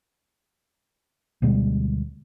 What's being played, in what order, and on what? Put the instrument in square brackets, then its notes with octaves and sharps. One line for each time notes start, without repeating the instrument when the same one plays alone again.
[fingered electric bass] D2 B2 G3 G#3